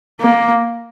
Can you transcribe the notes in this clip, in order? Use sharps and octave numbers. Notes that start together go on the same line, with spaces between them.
A#3